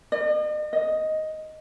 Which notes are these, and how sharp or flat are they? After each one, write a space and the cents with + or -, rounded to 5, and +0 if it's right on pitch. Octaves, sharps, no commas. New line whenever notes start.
D#5 -45
D#5 +5